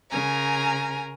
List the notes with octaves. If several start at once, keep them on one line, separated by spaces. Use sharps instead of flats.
C#3 A#4 G#5 A#5